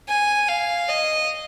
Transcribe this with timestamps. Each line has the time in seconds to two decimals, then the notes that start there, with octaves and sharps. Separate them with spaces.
0.09 G#5
0.48 F5
0.88 D#5